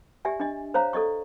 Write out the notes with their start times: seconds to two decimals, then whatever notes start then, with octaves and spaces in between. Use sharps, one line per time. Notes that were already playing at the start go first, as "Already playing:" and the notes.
0.25 G4 D5 E5 G#5
0.40 D4 D#5
0.74 C5 C#5 F5 A#5
0.93 A4 D5 D#5 C#6